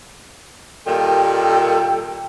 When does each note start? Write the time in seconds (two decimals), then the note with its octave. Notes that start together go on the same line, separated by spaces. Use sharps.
0.85 A#2 D#3 G3 A4 G5